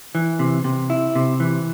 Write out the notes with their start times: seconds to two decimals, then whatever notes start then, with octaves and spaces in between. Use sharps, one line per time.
0.15 E3
0.39 C3
0.64 C3
0.90 E4
1.15 C3
1.40 E3